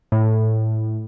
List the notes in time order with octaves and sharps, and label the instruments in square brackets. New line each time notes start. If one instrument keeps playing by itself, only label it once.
[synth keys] A2